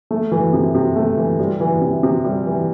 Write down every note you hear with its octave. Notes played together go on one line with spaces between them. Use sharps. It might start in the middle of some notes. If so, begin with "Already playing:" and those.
A3
E3
C3
C3
A3
E3
G3
E3
C3
C3
G3
E3